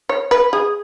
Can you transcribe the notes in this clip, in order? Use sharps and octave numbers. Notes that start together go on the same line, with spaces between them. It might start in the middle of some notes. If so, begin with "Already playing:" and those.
C#5
B4
G#4